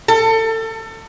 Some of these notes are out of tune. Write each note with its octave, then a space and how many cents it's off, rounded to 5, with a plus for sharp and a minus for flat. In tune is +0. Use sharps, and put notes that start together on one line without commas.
A4 +30